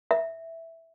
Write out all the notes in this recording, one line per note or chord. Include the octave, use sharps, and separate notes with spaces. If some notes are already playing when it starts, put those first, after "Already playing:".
E5